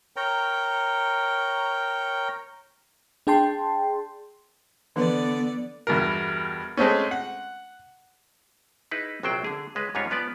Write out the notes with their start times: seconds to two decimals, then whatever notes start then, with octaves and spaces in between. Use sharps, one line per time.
0.16 A#4 C#5 G5 A#5
3.27 D4 G#4 G5 A5 C6
4.96 D3 E3 F3 B3 B4 D5
5.87 E2 G2 B2 A#4
6.77 G#3 A3 C4 C#4
7.11 F#5
8.91 D#4 E4 G#4 B4
9.23 A#1 C3 F#3 C5 D5 G5
9.44 D3 G#4
9.75 C#2 G#3 B4
9.95 G#2 G3 G#3 C#4 F4 C#5
10.10 F3 B3 B4 D5